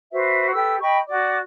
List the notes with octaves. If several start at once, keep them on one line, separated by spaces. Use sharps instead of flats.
F#4 B4 C5 E5
G4 A4 B4 E6
D#5 G5 B5 C#6
F#4 D5 D6